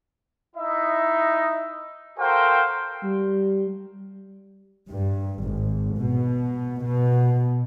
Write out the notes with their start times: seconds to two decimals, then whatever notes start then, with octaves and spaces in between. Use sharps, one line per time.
0.56 D#4 E4 D#5 E5
2.19 F#4 A4 A#4 C5 F5 G5
3.03 G3
4.90 G2
5.43 G#1
5.97 B2
6.84 B2